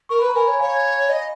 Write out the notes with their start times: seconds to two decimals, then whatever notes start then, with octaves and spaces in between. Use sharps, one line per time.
0.09 A#4 C#6
0.19 B4 B5
0.28 A#5
0.34 A#4 G#5 B5
0.48 C#5
0.60 C#5 F5 G#5
1.10 D#5